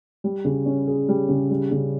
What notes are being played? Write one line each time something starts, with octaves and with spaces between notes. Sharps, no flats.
G3
C#3
C#4
G#4
G3
C#3
G3
C#3